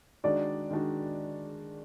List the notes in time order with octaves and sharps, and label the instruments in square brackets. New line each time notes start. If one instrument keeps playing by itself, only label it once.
[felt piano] D#3 G#3 D4 F#4 [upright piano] D5
[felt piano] D#3 G#3 D4 F#4